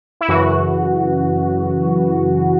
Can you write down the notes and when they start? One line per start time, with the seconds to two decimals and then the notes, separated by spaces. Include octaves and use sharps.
0.21 E4
0.28 F#2 C#3 E3 F#4